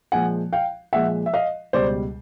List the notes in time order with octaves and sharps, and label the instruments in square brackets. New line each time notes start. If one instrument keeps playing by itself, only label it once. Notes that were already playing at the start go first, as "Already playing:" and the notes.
[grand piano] A#2 F3 G#3 F#5 G#5
F5 G5
A#2 F3 G#3 E5 F#5
E5
D#5 F5
C#2 B2 G3 C5 D5